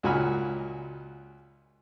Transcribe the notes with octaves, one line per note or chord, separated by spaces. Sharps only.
C#2 A#2 F#4 G#5 B5 F6